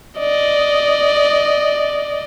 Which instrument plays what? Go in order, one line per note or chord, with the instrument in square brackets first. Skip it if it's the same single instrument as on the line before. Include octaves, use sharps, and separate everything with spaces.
[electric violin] D5 D#5